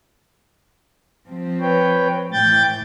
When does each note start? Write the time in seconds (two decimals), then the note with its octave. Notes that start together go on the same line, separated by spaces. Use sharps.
1.27 F3 C4
1.61 B4 C#5 G5
2.33 A2 E3 G5 G6 A6